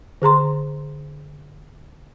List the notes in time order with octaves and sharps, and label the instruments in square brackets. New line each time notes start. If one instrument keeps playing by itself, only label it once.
[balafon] D3 G#4 A#5 C6